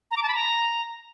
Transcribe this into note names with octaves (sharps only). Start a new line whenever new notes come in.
A#5
D6
A5
B5
A#5